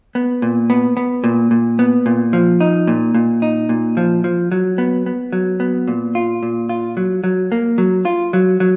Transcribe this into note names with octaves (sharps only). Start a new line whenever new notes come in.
B3
A#2
B3
B3
A#2
A#2
B3
A#2
F3
D#4
A#2
A#2
D#4
A#2
F3
F3
F#3
B3
B3
F#3
B3
A#2
F4
A#2
F4
F#3
F#3
A#3
F#3
F4
F#3
F#3